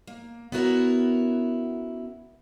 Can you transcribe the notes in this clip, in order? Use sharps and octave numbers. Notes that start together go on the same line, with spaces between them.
A#3
B3 C#4 E4 F#4 A#4